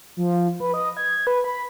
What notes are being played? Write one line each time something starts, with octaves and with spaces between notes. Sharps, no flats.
F3
B4
D#5
G#6
B4
B5